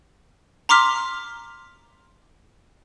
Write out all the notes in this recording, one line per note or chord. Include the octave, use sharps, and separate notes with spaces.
A#5 C6 D6 F6 B6